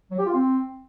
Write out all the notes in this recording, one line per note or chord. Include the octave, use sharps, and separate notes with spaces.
F#3
G4
F4
C4